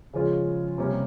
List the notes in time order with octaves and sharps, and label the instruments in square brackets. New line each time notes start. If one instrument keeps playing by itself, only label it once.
[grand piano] C#3 F3 G#3 C#4 F4
C3 G3 A#3 C#4